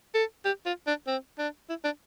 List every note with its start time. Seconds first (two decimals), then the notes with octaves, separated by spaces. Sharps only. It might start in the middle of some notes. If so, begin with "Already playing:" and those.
0.14 A4
0.45 G4
0.66 F4
0.87 D4
1.07 C4
1.38 D4
1.69 E4
1.84 D4